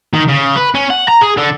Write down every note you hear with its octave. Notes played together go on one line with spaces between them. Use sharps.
D#3
C#3
B4
C#4
F#5
A#5
G#4
D3